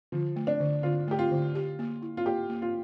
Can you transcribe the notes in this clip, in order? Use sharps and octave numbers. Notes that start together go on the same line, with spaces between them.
D3 F3
A3
D4
D3
D3 F4
A3 G4
F4
D3
G4
A#3
E4
F4
A#3 G4
A#3
F4